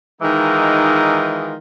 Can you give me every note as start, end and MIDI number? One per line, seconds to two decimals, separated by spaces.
0.22 1.56 51
0.22 1.56 52
0.22 1.56 56
0.22 1.56 63
0.22 1.56 65